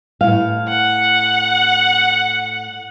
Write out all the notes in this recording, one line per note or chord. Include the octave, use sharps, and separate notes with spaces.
A2 F5
F#5